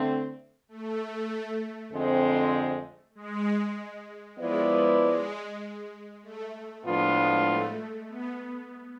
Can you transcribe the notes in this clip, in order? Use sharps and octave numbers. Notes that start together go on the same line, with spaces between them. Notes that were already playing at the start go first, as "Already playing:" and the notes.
Already playing: D3 A3 C4
A3
F2 D3 G#3 C4
G#3
F3 G#3 B3 E4 B4 D5
G#3
A3
A2 F3 G#3 B3 D4 F4
G#3
A3
B3